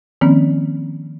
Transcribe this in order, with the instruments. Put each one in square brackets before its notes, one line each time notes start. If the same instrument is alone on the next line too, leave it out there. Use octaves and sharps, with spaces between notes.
[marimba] D#3 F3 A#3 C4 C#4